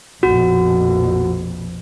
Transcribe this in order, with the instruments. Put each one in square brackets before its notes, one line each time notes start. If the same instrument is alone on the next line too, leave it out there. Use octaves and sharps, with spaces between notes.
[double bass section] A#1 F2 B2 [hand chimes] F#4